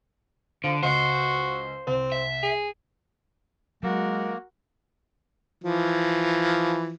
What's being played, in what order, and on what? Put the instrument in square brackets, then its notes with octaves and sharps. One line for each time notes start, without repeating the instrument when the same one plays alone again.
[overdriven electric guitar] D3 [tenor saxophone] F3
[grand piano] C#2 D#5 C#7 [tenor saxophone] F#4 [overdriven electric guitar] C5
[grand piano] C2 [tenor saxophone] C4
[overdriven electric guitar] E5
[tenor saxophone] G#4
[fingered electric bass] F#3 [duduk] G#3 [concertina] A#3 [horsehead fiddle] F#4 A#4
[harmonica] E3 F3